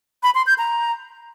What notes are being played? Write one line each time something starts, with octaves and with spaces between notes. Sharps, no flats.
B5
C6
G6
A#5